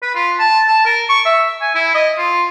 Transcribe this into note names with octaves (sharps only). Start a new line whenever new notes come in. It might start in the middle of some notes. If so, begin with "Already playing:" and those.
B4
F4
A5
A5
A#4
C#6
E5
G#5
E4
D#5
F4